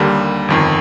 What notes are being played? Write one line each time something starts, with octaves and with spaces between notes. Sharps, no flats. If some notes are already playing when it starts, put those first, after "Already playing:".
Already playing: D#2 D3 G3 A#3
G1 F2 D#3